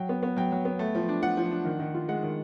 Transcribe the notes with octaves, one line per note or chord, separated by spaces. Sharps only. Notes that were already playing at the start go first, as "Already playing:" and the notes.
Already playing: F#3 G5
B3
B3
F#3 G5
F#3
B3
A3
F3
D4
F3 F#5
F3
D4
D#3
D#3
F4
G#3 F#5
D#3